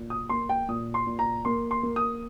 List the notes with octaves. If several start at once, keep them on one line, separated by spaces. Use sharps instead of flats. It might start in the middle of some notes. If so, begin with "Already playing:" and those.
Already playing: A#2
D#6
A#3 C6
G5
A#2 D#6
C6
A#2
A#5
A#3 C6
C6
A#3
D#6